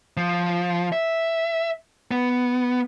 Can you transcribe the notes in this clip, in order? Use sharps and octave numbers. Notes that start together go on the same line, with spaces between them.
F3
E5
B3